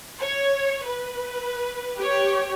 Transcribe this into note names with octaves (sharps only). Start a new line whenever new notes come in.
C#5
B4
G4 C#5